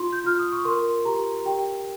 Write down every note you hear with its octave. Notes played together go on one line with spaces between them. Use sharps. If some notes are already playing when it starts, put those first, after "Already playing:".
Already playing: F4 C6
G6
F4 F6
D#6
C#6
A#4 C6
G4 A#5
G4 G5